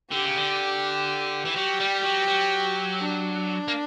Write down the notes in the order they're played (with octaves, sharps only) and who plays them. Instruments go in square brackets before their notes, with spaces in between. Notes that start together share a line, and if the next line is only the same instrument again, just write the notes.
[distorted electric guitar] D3 [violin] G4
[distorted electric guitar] C#3
D3
E3
[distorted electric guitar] F#3 [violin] G4
[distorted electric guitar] G3
F#3
F#3
[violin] D4
[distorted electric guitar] A#3